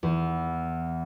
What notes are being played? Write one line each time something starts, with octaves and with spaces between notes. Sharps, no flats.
E2